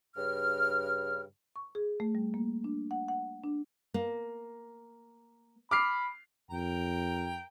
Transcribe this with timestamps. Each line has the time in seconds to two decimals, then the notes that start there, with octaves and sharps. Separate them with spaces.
0.17 G2 C#3 F6
1.56 C#6
1.75 G#4
2.00 A3
2.15 G3
2.34 A#3
2.64 D4
2.91 F#5
3.08 F#5
3.44 D4
3.94 A#3
5.71 B5 D6 F6 C7
6.51 F2 A#4 G5 A#5